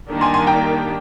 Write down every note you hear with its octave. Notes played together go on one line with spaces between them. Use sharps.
D#3 G3 A#3 D4 G4
G#5 C6
G#5 C6
G5 A#5